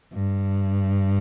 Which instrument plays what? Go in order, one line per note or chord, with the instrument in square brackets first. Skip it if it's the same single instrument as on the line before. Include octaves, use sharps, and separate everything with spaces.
[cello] G2